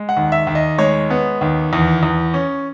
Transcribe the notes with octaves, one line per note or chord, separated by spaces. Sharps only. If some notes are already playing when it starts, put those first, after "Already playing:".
Already playing: G#3
F#5
D#2
E5
D#2
D#5
G#3 C#5
B3
D#2
E2
E2
C#4